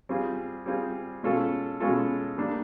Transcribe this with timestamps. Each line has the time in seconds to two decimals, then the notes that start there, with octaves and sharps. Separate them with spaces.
0.09 G3 C4 F4 G#4
0.66 G3 C4 F4 G#4
1.23 B2 G#3 C#4 F4 A4
1.80 B2 G#3 C#4 F4 A4
2.37 G3 A#3 D4